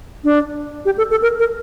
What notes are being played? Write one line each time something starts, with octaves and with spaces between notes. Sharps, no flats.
D4
G4
A4
A4
A#4
A#4